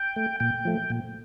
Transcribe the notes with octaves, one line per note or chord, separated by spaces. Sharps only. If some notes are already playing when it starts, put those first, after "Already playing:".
Already playing: G5
A3
A#2 G5
F3 A3
A#2